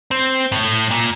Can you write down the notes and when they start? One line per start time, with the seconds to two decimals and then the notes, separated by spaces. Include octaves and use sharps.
0.11 C4
0.52 A2
0.91 A#2